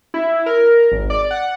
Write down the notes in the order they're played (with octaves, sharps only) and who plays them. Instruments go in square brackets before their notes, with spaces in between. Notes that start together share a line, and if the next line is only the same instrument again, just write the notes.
[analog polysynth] E4
A#4
G#1
D5
F#5